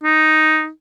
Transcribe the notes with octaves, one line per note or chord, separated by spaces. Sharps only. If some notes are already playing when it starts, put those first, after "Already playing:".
D#4